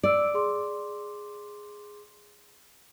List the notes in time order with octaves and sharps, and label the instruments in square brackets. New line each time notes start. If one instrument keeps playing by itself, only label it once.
[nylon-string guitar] D5 [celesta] E6 D7
[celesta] G#4 C6 D6